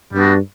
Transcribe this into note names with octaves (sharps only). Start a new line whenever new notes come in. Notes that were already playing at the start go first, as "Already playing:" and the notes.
G2 G3 B3 D4 F#4